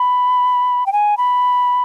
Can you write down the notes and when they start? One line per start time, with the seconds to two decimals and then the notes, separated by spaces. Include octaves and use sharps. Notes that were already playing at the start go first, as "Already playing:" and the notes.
Already playing: B5
0.86 G5
0.93 G#5
1.17 B5